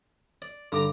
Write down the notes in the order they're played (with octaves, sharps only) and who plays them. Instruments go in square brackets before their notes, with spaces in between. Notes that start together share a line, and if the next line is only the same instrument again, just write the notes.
[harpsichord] D5
[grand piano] G2 D6 [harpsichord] D3 A#5